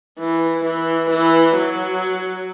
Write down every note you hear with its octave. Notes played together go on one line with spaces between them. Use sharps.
E3
E3
E3
F#3